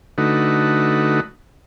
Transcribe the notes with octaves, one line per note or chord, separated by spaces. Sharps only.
D3 A3 D#4 F#4 B4